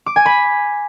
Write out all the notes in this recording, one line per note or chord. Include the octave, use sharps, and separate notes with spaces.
D6
G#5
B5